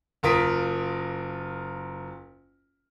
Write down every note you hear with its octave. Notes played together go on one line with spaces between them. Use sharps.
F#1 F4 A#4 D#6 B6 D7